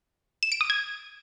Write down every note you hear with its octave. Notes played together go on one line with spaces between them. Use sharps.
E7
D7
D#6
G#6